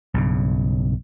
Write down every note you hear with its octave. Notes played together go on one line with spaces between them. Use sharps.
B1 G2 C#3